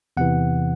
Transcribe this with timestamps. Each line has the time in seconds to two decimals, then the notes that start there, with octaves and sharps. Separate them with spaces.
0.17 E2 C3 E3 F#5